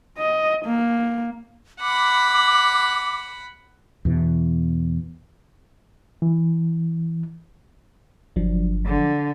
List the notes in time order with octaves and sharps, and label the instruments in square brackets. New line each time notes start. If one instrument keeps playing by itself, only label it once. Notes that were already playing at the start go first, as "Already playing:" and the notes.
[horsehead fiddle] D#5
A#3
[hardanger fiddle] F#5 B5 [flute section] D6
[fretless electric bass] E2 B2 E3
[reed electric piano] E3
[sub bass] G1 [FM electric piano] F3 F#3 D4
[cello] D3